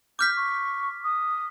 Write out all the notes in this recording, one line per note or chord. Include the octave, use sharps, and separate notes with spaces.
D6 F6 G6 B6
C#6
D#6